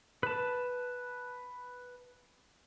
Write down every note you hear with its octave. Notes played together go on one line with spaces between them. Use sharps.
B4 A5